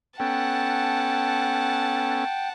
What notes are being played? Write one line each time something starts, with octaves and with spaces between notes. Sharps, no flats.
B3 C#4 A4 F#5 G5 A5